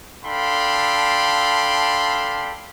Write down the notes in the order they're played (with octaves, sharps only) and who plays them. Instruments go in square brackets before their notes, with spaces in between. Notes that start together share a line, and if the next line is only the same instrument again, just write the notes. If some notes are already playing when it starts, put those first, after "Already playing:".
[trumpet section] D4 A4 F5 G5 B5 C6